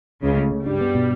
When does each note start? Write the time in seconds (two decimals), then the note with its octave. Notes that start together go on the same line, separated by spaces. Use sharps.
0.23 C#2 C#3 C#4
0.37 A3
0.52 C#3
0.65 G2 G3 D4
0.81 B3
0.95 B2